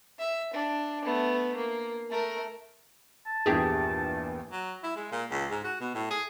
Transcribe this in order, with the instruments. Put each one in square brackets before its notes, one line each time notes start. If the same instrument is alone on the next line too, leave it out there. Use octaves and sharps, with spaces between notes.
[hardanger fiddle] E5
D4
A3 B3
A#3
A3 A#4
[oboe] A5
[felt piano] A#1 E2 G2 [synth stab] G4 G#4
[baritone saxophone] F#3
E4
G#3
A#2
C#2
G#2
F#4
B2
A2
G#4